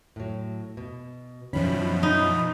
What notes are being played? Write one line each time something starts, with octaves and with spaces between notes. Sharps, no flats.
A2 F#3
B2
F#2 B2 D#3 F3 C#4 D4 E4 B5
D#4